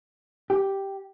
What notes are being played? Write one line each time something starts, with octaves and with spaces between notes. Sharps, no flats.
G4